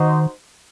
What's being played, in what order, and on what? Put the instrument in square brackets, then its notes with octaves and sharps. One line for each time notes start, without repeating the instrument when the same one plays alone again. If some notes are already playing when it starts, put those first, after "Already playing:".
Already playing: [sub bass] D#3 [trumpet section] D#4 F#4 C5 D#5